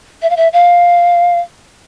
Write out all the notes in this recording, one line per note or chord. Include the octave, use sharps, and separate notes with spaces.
E5
F5
E5
F5